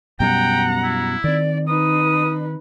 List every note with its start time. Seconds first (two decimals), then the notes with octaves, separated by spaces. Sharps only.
0.20 F#2 B2 G3 F#5 G5 A#5
0.84 E4
1.24 D#3 C4 D5
1.68 D#4 B4 D#6